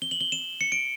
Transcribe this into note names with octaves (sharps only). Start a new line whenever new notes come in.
G7
F#7
G7
E7
C#7
D7